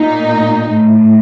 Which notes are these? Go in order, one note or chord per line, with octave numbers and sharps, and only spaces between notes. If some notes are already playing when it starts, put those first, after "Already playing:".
Already playing: A#2 D#4
A2